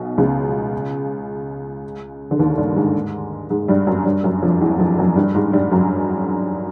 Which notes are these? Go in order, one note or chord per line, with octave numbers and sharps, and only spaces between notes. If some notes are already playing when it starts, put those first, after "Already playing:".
Already playing: B1 B2
C#2 C#3
D3
D#2 D#3
G2 G3
G#2 G#3
G#2 G#3
G2 G3
F#2 F#3
G2 G3
F#2 F#3
F2 F3
E2 E3
F2 F3
F#2 F#3
G2 G3
G#2 G#3
G2 G3
F#2 F#3